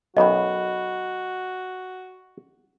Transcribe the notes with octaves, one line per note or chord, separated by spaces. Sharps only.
B1 F#2 F#4 D#5 G5 B5